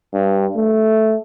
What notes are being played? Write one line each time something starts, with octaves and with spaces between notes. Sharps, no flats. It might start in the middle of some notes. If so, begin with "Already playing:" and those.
G2
A3